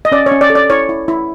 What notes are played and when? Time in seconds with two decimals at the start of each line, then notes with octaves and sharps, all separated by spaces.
0.05 D#5
0.12 C#4 D5
0.26 C#5
0.31 C#4
0.41 D5
0.50 A4
0.55 D5
0.70 E4 C#5
0.89 E4
1.08 E4